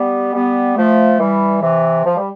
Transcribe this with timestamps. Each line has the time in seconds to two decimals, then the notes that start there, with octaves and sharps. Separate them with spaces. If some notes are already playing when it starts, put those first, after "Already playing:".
Already playing: G3 B3
0.34 G3 B3
0.76 F3 A3
1.19 E3 G3
1.61 C3 E3
2.05 F3
2.16 G3